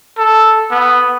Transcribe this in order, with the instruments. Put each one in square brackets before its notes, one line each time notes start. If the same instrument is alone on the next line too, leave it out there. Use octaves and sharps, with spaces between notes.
[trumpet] A4
B3